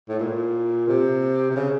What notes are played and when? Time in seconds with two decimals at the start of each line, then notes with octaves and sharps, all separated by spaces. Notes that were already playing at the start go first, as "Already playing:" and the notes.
0.09 A2
0.19 A#2
0.88 C3
1.51 C3
1.56 C#3